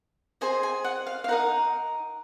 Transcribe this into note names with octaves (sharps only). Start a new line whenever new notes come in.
G#4 C5 D#5 G#5
G#5
F#5
F5
F5
D#4 A#4 D#5 F#5